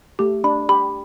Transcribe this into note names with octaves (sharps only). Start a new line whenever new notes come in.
A3 G4
D4 B5
G4 B5